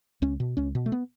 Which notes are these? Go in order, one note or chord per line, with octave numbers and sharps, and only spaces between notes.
C#2 C#4
B2
C#2 C#4
B2
A3
B3